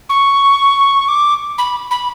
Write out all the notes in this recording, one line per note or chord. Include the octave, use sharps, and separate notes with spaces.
C#6
D6
B5
B5